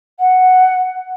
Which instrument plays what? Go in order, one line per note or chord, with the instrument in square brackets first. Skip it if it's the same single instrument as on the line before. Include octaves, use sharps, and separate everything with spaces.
[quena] F#5